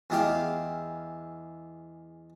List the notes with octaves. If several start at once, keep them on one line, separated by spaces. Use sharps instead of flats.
E2 G#3 E4 G4 F5